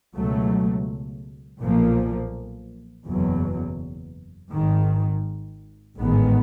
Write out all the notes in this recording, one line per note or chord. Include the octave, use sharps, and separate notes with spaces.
C#2 B2 F#3 A3
B1 A#2 F3 A#3
F#1 E2 B2 F#3
G#1 G#2 D#3
A1 G#2 D#3 G#3 B3